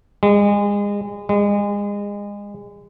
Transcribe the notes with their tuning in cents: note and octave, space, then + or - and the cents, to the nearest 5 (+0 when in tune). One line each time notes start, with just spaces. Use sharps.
G#3 -30
G#3 -30